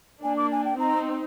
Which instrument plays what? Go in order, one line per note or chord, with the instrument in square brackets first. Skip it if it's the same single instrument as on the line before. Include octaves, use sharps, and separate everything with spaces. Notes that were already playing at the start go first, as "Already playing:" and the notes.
[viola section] A#3 D4 [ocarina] G#5
[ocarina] D6
G#5
G5
[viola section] C4 D#4 [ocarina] A#5